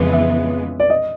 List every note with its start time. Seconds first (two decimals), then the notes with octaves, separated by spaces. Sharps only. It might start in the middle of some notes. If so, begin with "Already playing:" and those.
Already playing: F2 C#3 E3 G#3 B3
0.13 E5
0.80 D5
0.90 D#5